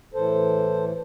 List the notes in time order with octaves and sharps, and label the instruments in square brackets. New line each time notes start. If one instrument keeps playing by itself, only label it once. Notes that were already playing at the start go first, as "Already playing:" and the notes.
[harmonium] A2 E3 A4 C5